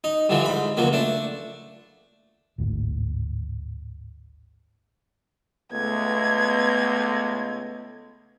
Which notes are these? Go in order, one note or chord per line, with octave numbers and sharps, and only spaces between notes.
D#4
G2 D3 E3 F3
G#2 B5
C#2 F3 F#3 A#3
A3 D4
G#1 D2 A2
C#2 A3 B3 G#6